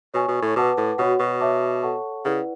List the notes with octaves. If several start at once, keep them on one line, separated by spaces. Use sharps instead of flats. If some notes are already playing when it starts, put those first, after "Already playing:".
B2 C#5 G#5 C#6
B2
A2
B2 B4 F#5 A5 D6
A2
B2 F#4 C#5 F#5
B2
C#5 E5 A5 D6
A4 C#5 F#5 A5 C#6
C#3 E4 B4 D5 F#5